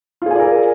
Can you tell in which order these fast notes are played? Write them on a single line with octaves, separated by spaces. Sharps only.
F4 G#4 G#5 D5 A#4